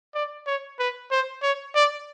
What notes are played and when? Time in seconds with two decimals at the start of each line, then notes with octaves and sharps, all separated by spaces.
0.14 D5
0.47 C#5
0.79 B4
1.11 C5
1.42 C#5
1.75 D5